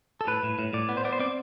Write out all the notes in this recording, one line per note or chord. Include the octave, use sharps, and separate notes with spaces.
A4
A2 B4
A2
A2
A2 D5
B3
C5
B3 D5
C5
C4 D5